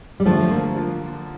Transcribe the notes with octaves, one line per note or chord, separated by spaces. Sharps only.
G3
D3 F3 A3
A#3
F3